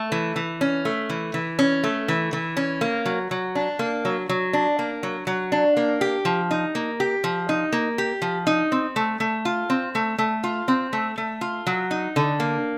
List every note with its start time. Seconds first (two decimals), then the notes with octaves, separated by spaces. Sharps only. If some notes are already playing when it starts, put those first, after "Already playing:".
Already playing: A3
0.12 E3
0.36 E3
0.61 C#4
0.85 A3
1.10 E3
1.34 E3
1.59 C#4
1.84 A3
2.08 E3
2.33 E3
2.57 C#4
2.81 A#3
3.06 F#3
3.31 F#3
3.55 D4
3.79 A#3
4.05 F#3
4.29 F#3
4.53 D4
4.79 A#3
5.03 F#3
5.27 F#3
5.52 D4
5.77 A#3
6.01 G4
6.25 F3
6.51 D#4
6.75 A#3
7.00 G4
7.24 F3
7.49 D#4
7.73 A#3
7.98 G4
8.22 F3
8.47 D#4
8.72 C4
8.96 A3
9.20 A3
9.45 F4
9.70 C4
9.95 A3
10.18 A3
10.44 F4
10.68 C4
10.93 A3
11.18 A3
11.41 F4
11.67 F#3
11.91 D#4
12.16 D3
12.40 A#3